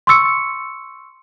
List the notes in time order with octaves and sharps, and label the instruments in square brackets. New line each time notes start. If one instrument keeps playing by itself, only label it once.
[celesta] C6 C#6 E6 C#7